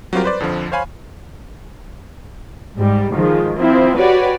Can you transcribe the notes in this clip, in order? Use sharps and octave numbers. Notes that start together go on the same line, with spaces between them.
F#3 G3 C4 F4 G4 A#4
B4 C5 D5
F2 D3 F3
C5 C#5 F5 G#5 B5
G#2 G3
D#3 F3 G#3
F3 C4 E4
F#4 G4 B4 C#5 D5